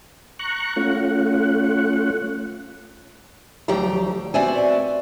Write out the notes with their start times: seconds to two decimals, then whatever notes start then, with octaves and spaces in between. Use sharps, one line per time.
0.39 A#5 C#6 F#6
0.76 A3 C#4 F4 F#5
3.68 D2 F3 F#3 G4 G5 A#5
4.34 B3 C4 F#4 D5 E5 G#5